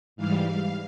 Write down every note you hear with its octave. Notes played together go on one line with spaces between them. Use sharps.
G#2 E3 G3 F5
F5